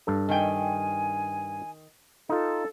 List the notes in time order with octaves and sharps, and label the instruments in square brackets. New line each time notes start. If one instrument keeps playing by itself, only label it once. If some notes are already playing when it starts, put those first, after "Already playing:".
[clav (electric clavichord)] G2 A4
[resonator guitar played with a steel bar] D#3 G5 [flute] G#5
[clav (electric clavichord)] D#4 F4 [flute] A4